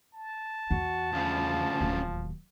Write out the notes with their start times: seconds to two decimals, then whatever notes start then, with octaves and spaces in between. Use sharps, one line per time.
0.14 A5
0.71 E2 F#4
1.13 D2 C#3 F3
1.81 D1 D#2